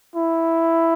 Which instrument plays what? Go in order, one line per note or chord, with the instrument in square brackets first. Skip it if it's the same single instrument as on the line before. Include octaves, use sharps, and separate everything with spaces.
[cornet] E4